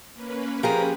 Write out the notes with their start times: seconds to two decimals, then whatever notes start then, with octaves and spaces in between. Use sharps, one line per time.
0.14 A#3 C#4 B4
0.63 F3 G4 G#4 A#4